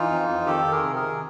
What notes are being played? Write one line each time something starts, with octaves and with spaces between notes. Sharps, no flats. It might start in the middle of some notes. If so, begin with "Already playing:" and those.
Already playing: E3 D#4 F4
F2
F2
D#3 G4 A4
D#3
G#4 A#4
C3
G#4 A#4
D#3